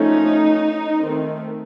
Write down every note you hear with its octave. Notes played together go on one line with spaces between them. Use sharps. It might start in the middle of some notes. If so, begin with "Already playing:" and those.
Already playing: F3 A3 C#4 D#4
D#3 A3 C4